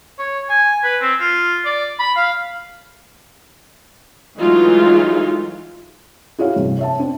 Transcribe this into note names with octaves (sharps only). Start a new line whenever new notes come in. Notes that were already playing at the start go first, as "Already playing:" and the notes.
C#5
G#5
B4
C4
F4
D5
B5
F5
E3 F#3 G#3 A3 D#4 F4
E4 F#4 G#4 C#5 F5
G2 C3
C#5 E5 A5
C4 D4